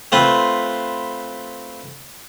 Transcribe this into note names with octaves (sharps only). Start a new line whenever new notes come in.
A3 C4 F4 B4